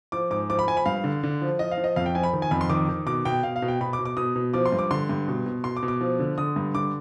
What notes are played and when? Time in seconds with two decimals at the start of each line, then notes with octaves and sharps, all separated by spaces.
0.12 F3 D6
0.30 G#2 D6
0.50 F3 D6
0.59 B5
0.67 F3 G#5
0.77 B5
0.85 G2 F5
1.04 D3
1.23 D3
1.42 F3
1.59 F3 D#5
1.71 F5
1.77 F3
1.84 D#5
1.96 F2 F5
2.06 G5
2.15 F3 G#5
2.23 B5
2.33 D#3
2.42 G#5
2.51 F2 B5
2.61 C6
2.70 D#3 D6
2.89 D#3
3.06 B2 D6
3.25 B2 G5
3.43 B2 F5
3.56 F5
3.62 B2
3.68 G5
3.81 B2 B5
3.93 D6
3.99 B2
4.05 D6
4.17 B2 D#6
4.35 B2
4.54 F3 D6
4.66 C6
4.72 G2
4.79 D6
4.91 D3 C6
5.09 G2
5.28 B2
5.46 B2
5.64 B2 C6
5.77 D6
5.83 B2
5.88 D6
6.01 F3
6.19 D3
6.38 D3 D#6
6.56 G2
6.74 D3 D6